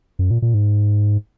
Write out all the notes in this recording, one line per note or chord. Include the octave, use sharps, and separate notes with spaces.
F#2
A#2
A#2
G#2